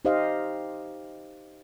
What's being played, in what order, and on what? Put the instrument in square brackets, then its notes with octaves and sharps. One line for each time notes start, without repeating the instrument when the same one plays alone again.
[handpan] D#4 G4 C5 D#5 F5